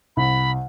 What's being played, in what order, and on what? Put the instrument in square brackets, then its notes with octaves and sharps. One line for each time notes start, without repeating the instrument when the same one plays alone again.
[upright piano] C2 [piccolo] B5